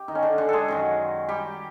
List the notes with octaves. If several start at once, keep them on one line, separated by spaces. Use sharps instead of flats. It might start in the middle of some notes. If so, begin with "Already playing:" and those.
Already playing: G4
D#3 D#4
C#4
D3 D4
D3 D4
G#3 G#4 A4
F#2 D#3 F#3
G3 G4